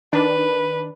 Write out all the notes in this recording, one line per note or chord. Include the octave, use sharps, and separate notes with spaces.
D#3 D4 B4